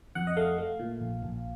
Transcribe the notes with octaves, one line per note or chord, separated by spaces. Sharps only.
F2 F#5
D#5
A3 F5
A3
A#2
A#1
A#1